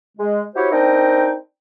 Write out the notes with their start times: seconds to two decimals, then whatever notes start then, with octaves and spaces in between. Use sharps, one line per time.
0.18 G#3
0.55 E4 F#4 G4 C5 C#5
0.71 C4 D4 D#4 A#4 D#5 G5